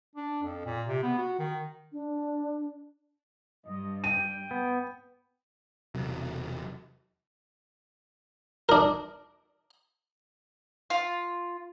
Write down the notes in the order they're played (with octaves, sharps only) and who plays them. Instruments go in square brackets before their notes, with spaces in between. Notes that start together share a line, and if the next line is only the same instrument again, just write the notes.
[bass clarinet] D4
F2
A#2
C3
B3
F#4
D#3
[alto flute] D4
[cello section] G2 [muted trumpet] D#5
[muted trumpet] G5 [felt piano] D#7
[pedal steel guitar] B3
[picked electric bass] E1 C3 F#3
[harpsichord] D4 A#4
[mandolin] F4